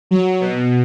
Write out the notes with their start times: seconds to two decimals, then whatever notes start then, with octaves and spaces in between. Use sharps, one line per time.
0.11 F#3
0.41 B2